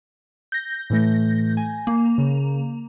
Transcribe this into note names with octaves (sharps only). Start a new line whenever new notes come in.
G6 A#6
A2 E3 A3
G#5
A#3
C#3